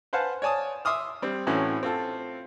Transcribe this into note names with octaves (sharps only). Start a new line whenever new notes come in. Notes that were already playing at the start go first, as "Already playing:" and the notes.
B4 C5 F5 F#5 G#5 A5
C#5 D5 G#5 A5 D#6
E5 C6 D6 D#6 F6
G3 C4
A2 E3 C4 C#4 F#4
C4 F4 A4